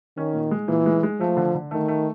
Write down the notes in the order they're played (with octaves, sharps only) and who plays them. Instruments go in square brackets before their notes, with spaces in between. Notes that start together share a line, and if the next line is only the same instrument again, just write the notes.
[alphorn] D#3 [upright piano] C#4
[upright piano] A#2
G#3
[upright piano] A#2 [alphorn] E3
[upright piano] G#3
G#3
[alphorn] F3 [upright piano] A3
[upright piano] D3
D3
[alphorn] D#3 [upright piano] A3
[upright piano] A3